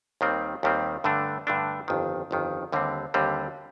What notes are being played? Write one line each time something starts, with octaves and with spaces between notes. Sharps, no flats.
D#2 D#3 G3 C4
D#2 D#3 G3 C4
G2 D3 A3 D4
G2 D3 A3 D4
G1 F2 D#3
G1 F2 D#3
D#2 D3 G3 C4
D#2 D3 G3 C4